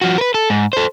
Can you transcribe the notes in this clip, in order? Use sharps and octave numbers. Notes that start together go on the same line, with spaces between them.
F3 F#4
A#4 B4
A4
G#2
A4 C5